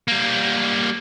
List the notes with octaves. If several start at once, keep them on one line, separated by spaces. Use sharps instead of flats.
G3 A#3